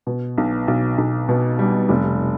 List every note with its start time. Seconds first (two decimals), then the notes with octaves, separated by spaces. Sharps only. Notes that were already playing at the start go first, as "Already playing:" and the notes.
0.07 B2
0.38 B1
0.68 B1
0.98 B1
1.29 B2
1.59 G3
1.89 F1